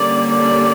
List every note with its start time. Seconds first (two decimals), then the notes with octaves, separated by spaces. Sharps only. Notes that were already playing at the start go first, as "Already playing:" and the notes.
Already playing: D3 G3 A#3 C#4 D5
0.31 D5